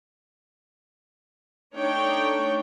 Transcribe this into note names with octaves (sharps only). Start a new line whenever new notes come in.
A3 D4 D#4 C#5 G5